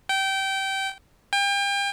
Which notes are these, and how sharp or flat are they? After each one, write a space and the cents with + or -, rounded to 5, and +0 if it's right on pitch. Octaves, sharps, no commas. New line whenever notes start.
G5 -20
G5 +35